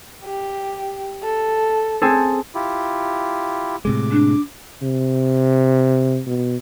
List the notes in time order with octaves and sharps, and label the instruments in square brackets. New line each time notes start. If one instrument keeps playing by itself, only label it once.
[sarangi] G4
A4
[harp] C4 G#4 A4
[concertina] E4 F4 G4
[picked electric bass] A2 C3 G#3 [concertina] D6
[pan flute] D4
[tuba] C3
B2